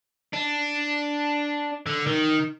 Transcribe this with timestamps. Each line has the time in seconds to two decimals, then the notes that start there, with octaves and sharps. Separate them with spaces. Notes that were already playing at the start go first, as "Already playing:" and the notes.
0.34 D4
1.86 D3
2.07 D#3